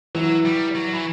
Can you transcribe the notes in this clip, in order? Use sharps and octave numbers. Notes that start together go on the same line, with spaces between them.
E3 F#3
G3
F#3
E3